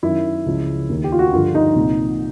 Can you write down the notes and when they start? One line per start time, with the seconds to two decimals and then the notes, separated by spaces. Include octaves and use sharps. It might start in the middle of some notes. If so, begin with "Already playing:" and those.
0.03 F#2 D#3 E4
0.46 C#2 C#3 F3
0.89 D#2 D#3
1.04 G4
1.12 F4
1.19 F#4
1.33 G2 D3 F3 F4
1.55 D#4
1.75 C2 A#2 F3